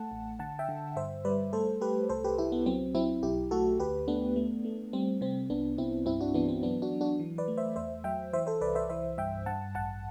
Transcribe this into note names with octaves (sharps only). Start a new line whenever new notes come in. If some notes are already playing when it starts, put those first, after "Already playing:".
Already playing: A3 F#5 A5
A1
D3 F#5 A5
E5 G5
D3
G2 C5 E5
G3 B4 D5
A3 A4 C5
A3 G4 B4
C2 A4 C5
G4 B4
C2 E4 G4
B3
F#3 C4
F#3 C4 E4
B1 E4 G4
A3 F#4 A4
D2 G4 B4
A3 B3 D4
A3
A3
G3 C4
C3 C4
C2 B3 D4
C2 C4 E4
G2 C4 E4
D4 F#4
E3 B3 D4
C4
F#3 B3 D4
D4 F#4
F#3
D4 F#4
E3
B4 D5
A3
C5 E5
E2 C5 E5
F#3 E5 G5
E3 C5 E5
A4 C5
C2 B4 D5
C5 E5
E3 C5 E5
G2 E5 G5
G2 F#5 A5
A1 F#5 A5